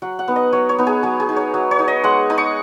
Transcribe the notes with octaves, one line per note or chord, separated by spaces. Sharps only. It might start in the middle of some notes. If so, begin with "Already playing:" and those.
F#3 F#5
F#5
B3 D#4
D#5
F#3 C#5
C#5
B3 D#4
G#4
F#3 G#4
G#4
D#4
C#5
F#3
C#5
D#4
D#5
G#3 F#5
D#4 D#6
C#6